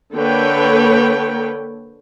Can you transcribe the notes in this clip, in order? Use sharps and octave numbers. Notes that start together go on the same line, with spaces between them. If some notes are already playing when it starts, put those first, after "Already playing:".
D3 A#3 A4 B4 C#5 G5